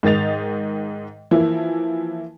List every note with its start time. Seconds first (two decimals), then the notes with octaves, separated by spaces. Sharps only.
0.03 G#2 D#3 D#5 A6 F7
1.31 E3 F3 A#3 E4